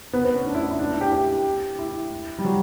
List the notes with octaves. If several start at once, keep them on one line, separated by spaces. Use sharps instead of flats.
B3
B3
C#4
D4
E4
E4
D4
E4
G4
G4
E4
G3
F#3